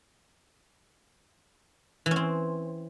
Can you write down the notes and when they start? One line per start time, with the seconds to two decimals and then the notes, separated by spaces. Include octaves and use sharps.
2.06 E3
2.11 C#4
2.16 C4